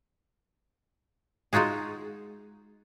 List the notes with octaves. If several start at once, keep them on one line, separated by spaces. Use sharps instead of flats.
G#3 D#4 F4 F#4 G#4